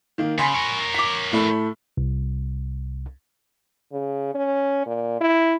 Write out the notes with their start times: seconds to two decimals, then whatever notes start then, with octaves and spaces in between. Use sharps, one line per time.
0.18 D#3 A#3
0.38 C#3 G#5 B5 C6
0.54 A#4 C#5
0.94 D6 B6
1.32 A2 A3 B5
1.97 C2
3.93 C#3
4.34 C#4
4.86 A#2
5.20 E4